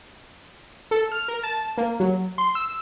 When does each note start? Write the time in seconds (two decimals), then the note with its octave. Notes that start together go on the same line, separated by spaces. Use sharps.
0.91 A4
1.12 F6
1.28 A#4
1.43 A5
1.78 A#3
2.00 F#3
2.38 C6
2.55 E6